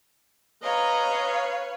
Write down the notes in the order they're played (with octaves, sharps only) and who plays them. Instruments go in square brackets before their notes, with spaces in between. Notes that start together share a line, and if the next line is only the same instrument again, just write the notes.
[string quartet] B4 C#5 F5 [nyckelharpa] D#5 A#5